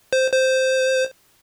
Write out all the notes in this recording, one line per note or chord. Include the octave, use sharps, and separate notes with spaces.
C5
C5